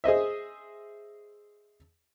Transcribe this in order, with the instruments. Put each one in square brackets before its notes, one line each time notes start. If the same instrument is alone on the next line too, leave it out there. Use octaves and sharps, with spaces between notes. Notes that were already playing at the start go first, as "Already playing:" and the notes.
[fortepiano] G#4 C5 D#5 E5